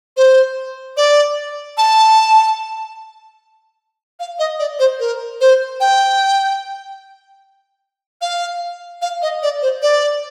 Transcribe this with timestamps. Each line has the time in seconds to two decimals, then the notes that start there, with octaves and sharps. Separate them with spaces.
0.17 C5
0.97 D5
1.78 A5
4.20 F5
4.39 D#5
4.59 D5
4.79 C5
5.00 A#4
5.41 C5
5.80 G5
8.22 F5
9.02 F5
9.22 D#5
9.43 D5
9.62 C5
9.82 D5